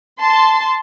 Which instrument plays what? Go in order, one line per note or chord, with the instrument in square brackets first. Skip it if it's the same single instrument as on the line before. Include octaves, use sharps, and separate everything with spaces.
[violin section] A5 C6